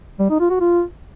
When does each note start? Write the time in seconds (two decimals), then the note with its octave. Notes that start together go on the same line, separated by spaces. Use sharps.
0.19 G3
0.30 D#4
0.40 F4
0.50 F#4
0.60 F4